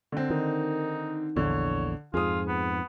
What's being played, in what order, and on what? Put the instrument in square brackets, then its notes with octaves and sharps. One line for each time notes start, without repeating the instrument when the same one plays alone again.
[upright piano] D3 C4
[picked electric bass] D#3 [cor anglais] D#4
[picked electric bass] A#1 E2 [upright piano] D3 [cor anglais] C#5
[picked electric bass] F2 G#2 [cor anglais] F4 [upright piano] G#4 D#6
[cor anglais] B3